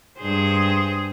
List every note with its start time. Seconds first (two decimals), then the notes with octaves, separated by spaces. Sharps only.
0.19 G2 G#4 C5